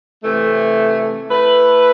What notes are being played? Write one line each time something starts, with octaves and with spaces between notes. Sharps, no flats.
C3 E3 A3
A3 E4 B4